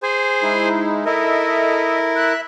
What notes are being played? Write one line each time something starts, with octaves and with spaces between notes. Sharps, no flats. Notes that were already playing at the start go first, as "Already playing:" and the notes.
G#4 C5 G#5
G#3 D#4 E4
E4 A4 A#4 D#5 E5
E5 F#6